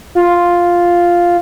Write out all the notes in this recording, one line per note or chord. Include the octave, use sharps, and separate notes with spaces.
F4